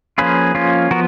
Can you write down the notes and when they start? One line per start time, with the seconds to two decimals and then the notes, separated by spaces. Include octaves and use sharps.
0.18 F3 A#3 C#4 F4 G#4 B4
0.55 F3 A#3 C#4 F4
0.91 F3 B3 F#4 A#4